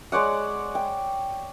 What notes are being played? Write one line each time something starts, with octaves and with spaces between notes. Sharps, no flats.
G#3 C#5 D5 F#5
G5